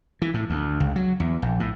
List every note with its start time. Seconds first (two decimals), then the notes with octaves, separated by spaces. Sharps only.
0.22 E3
0.34 A2
0.50 D2
0.80 C#2
0.96 F#3
1.20 E2
1.42 A#1
1.60 A2